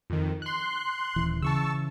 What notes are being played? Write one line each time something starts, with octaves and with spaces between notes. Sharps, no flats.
F2 D#3
C6 F#6
D#1 E3
C#3 E3 A5 C#6 E6